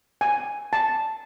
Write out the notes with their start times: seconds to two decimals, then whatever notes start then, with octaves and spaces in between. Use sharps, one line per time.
0.21 G#5
0.73 A5